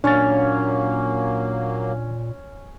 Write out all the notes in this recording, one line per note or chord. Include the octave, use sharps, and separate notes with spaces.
A#2 F#3 A#3 C#4 D4 C#5 A6